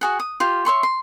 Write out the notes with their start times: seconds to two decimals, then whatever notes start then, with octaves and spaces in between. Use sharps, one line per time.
0.01 F#4 G#4 F#5
0.20 D#6
0.40 F4 G4 F5
0.65 C#5 E5 C6 C#6
0.83 C6